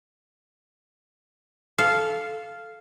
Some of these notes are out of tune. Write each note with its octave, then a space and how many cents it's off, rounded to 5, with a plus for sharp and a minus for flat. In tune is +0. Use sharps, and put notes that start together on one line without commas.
A4 -15 F5 -5